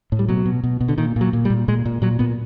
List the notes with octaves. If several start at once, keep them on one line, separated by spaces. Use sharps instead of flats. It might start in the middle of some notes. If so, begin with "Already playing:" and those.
A2
G3
B2 F#3
B2
B2
B2
D3
A#2 D#3
A#2 F#3
A#2
G3
A#2
A#2 G#3
A#2
A#2 F#3
A#2 B3